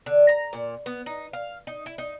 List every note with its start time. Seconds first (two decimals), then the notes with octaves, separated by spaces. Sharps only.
0.06 D3
0.29 A#5
0.53 A#2
0.86 B3
1.06 D#4
1.33 F5
1.67 D#4
1.86 E4
1.98 D#4